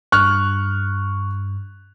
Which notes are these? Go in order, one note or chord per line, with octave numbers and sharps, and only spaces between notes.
G2 C#6 F6 F#6